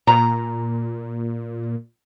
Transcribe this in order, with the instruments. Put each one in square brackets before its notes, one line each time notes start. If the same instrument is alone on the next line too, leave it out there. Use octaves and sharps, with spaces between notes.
[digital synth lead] A#2 [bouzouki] A#5